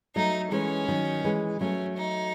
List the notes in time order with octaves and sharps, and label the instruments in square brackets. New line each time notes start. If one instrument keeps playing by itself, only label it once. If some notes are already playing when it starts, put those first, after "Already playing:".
[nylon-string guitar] F#3 A3 [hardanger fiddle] D#4
[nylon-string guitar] E3 G#3 [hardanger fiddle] C#4
[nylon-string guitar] D#3 F#3
E3 G#3
[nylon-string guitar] F#3 A3 [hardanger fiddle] C#4
[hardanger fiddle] D#4